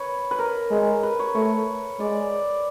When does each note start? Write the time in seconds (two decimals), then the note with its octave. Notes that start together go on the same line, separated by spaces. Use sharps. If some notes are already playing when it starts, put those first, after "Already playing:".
Already playing: B4 C#5
0.31 B4
0.39 A#4
0.71 G#3
1.03 B4
1.19 C#5
1.35 A3 C#5
1.99 G#3 D5